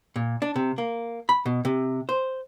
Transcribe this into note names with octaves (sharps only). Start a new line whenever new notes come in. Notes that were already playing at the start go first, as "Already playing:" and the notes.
A#2
D4
C3
A#3
B5
B2
C3
C5